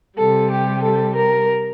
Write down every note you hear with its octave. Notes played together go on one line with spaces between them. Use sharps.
C3 G3 A4
G4
A4
A#4